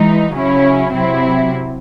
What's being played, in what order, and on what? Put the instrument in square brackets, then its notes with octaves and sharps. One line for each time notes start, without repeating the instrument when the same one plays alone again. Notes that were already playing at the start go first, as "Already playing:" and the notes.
Already playing: [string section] E3 G#3 D#4
C#3 F#3 C#4 E4
C3 F#3 C4 E4